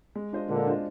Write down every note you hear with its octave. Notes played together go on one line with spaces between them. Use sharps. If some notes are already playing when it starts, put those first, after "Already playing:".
G#3
D4 F4 C5 D#5
A#2 D3 G#3
D4 F4 C5 D#5